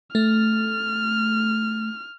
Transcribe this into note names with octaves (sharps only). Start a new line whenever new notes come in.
A3 F6